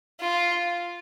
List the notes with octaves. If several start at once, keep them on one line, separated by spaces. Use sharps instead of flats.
F4